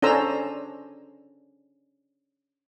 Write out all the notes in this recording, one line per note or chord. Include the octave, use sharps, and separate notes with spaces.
C#4 D4 A4 C5 A#5 E6